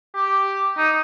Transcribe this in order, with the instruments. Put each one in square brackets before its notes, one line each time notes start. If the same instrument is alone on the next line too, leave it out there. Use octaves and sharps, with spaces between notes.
[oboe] G4
D#4